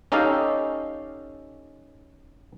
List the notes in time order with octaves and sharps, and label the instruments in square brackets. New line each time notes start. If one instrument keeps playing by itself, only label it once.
[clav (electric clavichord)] C#4 D#4 G4 A4 D#5 F5